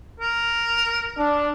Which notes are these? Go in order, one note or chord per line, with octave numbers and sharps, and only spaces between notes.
A#4
D4